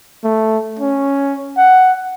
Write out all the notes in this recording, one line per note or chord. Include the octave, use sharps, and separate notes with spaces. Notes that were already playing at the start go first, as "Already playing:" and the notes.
A3
C#4
F#5